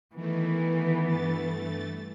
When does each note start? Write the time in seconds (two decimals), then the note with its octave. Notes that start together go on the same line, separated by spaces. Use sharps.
0.16 D#3 E3 A3 B3
1.05 G2 A3 A6